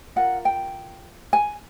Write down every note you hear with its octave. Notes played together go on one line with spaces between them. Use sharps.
F4 A#4 F#5
G5
G#5